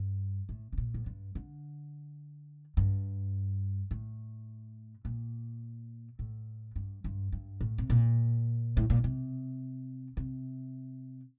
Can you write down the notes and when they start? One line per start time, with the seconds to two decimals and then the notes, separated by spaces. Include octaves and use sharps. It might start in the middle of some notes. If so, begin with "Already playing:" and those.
Already playing: G2
0.49 A2
0.72 C3
0.78 A#2
0.94 A2
1.06 G2
1.35 D3
2.77 G2
3.91 A2
5.05 A#2
6.19 A2
6.76 G2
7.04 G2
7.32 G2
7.61 A2
7.78 C3
7.90 A#2
8.77 A2
8.90 A#2
9.04 C3
10.17 C3